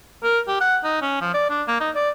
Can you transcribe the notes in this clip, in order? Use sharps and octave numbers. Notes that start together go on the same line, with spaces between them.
A#4
G4
F#5
D#4
C#4
F3
D5
D4
A#3
D#4
D5